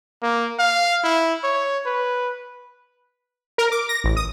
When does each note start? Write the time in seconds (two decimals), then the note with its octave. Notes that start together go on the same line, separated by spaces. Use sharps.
0.23 A#3
0.59 F5
1.03 E4
1.44 C#5
1.86 B4
3.58 A#4
3.72 D6
3.89 A#6
4.04 A1
4.17 D#6